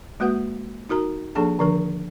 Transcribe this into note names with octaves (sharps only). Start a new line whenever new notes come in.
G#3 A#3 F#4 B4 F#5
D#4 F#4 A#4 A#5
F3 A#3 D4 G#4 A4 A5
D3 D#3 F3 D4 A#4